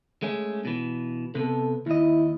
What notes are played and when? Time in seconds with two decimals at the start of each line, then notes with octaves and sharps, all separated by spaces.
0.22 G#3 A3 C#4
0.65 B2 E3
1.35 C3 B3 A4
1.86 D#2 E4 D#5